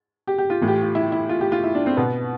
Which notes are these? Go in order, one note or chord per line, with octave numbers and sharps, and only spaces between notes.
G4
G4
F4
A2 E3
G4
F4
E4
E4
F4
G4
F4
E4
D4
C4
B2 B3